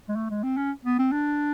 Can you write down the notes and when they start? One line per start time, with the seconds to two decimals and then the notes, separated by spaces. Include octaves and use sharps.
0.09 G#3
0.16 A3
0.30 G#3
0.43 C4
0.57 C#4
0.85 B3
0.99 C4
1.12 D4